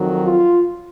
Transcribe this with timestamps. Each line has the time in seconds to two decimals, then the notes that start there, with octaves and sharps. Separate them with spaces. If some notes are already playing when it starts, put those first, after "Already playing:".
Already playing: F2 D#3 F#3
0.24 F4